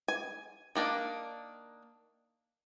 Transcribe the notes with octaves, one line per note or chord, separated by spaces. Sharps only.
G#5
D#3 A#3 D4